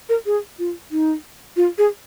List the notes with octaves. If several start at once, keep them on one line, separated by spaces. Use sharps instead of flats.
A#4
G#4
F4
D#4
F4
G#4